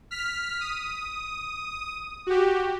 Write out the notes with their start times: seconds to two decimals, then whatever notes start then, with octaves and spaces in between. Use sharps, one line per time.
0.11 F6 B6
0.61 D#6
2.27 F#4 G4